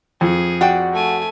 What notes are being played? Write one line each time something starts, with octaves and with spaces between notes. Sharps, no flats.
F2 G#4
F#4 D5 F#5 G5
A3 G#5